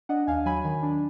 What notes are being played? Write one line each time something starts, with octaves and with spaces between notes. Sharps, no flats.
D4 D#5 F#5
D#2 F5 G#5
F#3 G#5 B5
D#3
D4